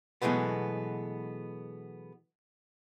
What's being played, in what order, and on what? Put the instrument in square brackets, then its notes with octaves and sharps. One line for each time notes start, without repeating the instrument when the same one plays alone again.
[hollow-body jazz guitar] B2 E3 F#3 G#3 A3 B3